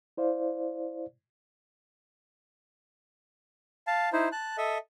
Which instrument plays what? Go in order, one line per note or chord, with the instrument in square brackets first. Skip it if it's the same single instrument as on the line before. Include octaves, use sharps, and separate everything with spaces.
[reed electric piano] E4 C5 D5 F5
[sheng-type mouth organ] F5 A5
D#4 E4 C5
A5 F#6
A4 D#5 E5